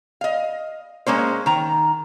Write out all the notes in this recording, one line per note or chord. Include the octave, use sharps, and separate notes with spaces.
D#5 F5
G#3 A#3 C#4 C5
D#3 A#5